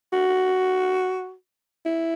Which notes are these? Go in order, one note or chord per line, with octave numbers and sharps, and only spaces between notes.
F#4
E4